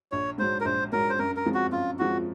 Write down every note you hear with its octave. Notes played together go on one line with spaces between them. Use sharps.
A#1 C#5
G#2 F#3 C5
A#4
A#1 C5
G#2 F#3 A#4
C5
F#2 A#4
A#4
F3 G#3 C4
F#4
F#2 F4
F3 G#3 C4 F#4